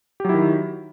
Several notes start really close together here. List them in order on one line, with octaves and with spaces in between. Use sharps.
G4 F#3 E4 D#3